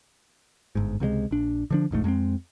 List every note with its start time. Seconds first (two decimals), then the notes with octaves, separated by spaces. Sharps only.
0.75 G1 G#2
1.00 C#2 C3 F3 G#3
1.31 A#1 D4
1.70 D3 F3 D4
1.91 F1 A#1 G#2 A3
2.04 F2 G#3 B3 C4